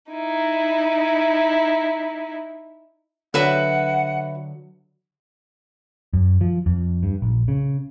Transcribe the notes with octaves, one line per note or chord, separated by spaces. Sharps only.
D#4 E4
D3 F#3 F#4 B4 E5 F#5
F#2
F3
F2
G2
A#1
C#3